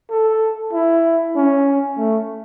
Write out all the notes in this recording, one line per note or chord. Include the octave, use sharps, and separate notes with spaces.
A4
E4
C#4
A3